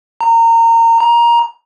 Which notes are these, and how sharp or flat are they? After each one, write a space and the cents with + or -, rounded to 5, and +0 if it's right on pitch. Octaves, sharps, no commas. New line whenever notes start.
A#5 -25
A#5 +15